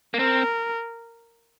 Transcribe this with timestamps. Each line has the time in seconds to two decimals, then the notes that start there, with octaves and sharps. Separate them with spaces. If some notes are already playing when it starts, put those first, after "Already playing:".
0.14 A#3
0.19 C4 A#4